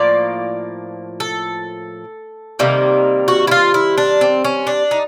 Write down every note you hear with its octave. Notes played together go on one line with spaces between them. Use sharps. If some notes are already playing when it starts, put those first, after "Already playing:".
Already playing: A2 F3 A#3 D5
A4
C3 D#3 G3 A#3
F#4
E4
F4
E4
D4
C4
C#4
D4
D#4